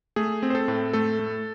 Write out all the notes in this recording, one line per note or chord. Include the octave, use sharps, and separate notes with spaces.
A3 G#4
C4
C5
A4
A2
A3 A4
A3